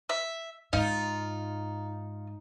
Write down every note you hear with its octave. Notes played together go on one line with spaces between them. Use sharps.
E5
G#2 D#4 F4